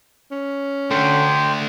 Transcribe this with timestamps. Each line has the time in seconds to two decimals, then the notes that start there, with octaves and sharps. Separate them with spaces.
0.32 C#4
0.91 D3 A3 D4 G5 C6